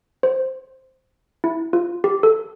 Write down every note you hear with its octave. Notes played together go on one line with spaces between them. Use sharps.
C5
E4
F4
G4
A4